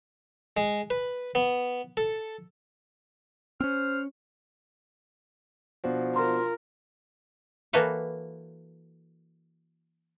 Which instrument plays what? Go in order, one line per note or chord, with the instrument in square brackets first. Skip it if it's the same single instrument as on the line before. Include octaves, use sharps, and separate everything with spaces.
[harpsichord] G#3
B4
B3
A4
[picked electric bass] C4 C#4 [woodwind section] C5 F6
[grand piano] B2 D4 F#4 [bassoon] F3
[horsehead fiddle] F4 A#4 [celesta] C6
[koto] E3 A#3 F#4 A4 B4 C#5